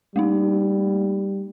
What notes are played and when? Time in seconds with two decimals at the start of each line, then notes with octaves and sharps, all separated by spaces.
0.16 G3 A3 A#3 D#4